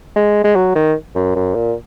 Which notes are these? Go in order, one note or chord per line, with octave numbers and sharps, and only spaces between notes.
G#3
G#3
F#3
D#3
F#2
F#2
A#2